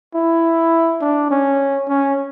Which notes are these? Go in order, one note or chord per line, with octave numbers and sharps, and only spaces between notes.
E4
D4
C#4
C#4